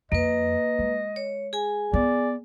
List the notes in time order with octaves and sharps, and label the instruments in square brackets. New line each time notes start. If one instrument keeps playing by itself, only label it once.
[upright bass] F2 [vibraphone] A#3 B4 [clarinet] D#5
[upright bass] G#3
[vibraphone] C#5
G#4 G#5
[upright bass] B3 [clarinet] D5